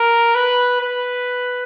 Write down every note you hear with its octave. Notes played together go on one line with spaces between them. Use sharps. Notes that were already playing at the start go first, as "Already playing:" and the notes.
Already playing: A#4
B4
B4